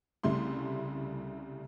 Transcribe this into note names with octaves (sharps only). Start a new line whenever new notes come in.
C2 C#3 G3 A3 C6